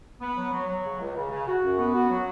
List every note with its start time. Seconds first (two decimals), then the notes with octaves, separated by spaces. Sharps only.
0.20 B3
0.37 F#3
0.53 F#3
0.68 F#3
0.84 C#3
1.00 C#2
1.16 C#3
1.30 C#3
1.47 F#4
1.62 F#2
1.79 B3
1.94 F#4
2.10 F#3